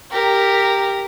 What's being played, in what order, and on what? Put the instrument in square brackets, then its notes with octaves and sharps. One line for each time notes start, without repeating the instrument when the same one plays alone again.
[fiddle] G4 [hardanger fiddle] A#4